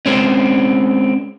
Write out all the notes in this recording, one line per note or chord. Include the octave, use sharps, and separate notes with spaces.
G#3 C4 C#4